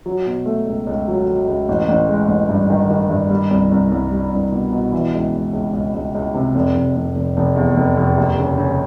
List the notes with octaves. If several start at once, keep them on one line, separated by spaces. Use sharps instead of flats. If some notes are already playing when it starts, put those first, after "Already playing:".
F#3
B2
A3
C#2
C#2
F#3
F#3
C#2
A1
A1
G#3
A1
G2
D#3
D#3
G2
G3
C2
C2
C2
G3
C2
B2
B2
E3
C#2
C#2
C#2
C#2
C#2
C#2
C3
F1
F1
F1
F1
F1
E2
F1
F1
D#2
C#3
C#3